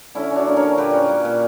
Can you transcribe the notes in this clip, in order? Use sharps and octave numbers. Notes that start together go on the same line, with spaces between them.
D3 C#4 E4
C#4
D4 F#4
A#3
A#4 C#5
D3
A#2 G4 B4
C#4
A#3
A#2